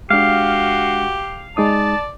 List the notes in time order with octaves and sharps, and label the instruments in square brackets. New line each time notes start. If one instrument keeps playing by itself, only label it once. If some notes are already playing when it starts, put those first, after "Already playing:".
[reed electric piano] G#3 D4 [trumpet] F#4 [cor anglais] G4 [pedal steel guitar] F5
[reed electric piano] G#3 D#4 D#6 [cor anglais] D5 [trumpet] A5